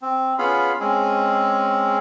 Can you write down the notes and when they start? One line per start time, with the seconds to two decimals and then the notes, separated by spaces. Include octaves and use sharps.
0.02 C4
0.39 B3 C#4 F4 G#4 F5 B5
0.80 G#3 C4 C#4 G#4